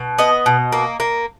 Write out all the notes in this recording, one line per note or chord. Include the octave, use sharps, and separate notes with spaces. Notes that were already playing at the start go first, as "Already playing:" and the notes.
Already playing: B2
B3 D#5
B2
A#3
A#3